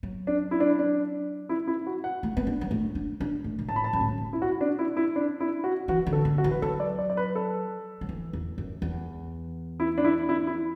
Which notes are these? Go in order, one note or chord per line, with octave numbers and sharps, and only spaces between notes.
F#3
D4
E4
D4
D4
E4
E4
F#4
F#5
A3
B3
D4
F#3
A3
D4
D4
A3
B2
A2 A5
B5
A5
F#2
A2
F#2
B2
E4
F#4
D4
E4
E4
D4
E4
F#4
E3 F#4
D3
A4
D3
F#4
E3
B4
F#3 A4
D5
D5
D5
B4
A4
F#3
E3
E2
F#2
E2
E4
D4
E4
E4
E4